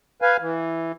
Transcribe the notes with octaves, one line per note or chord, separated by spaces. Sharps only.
B4 F5 G#5
E3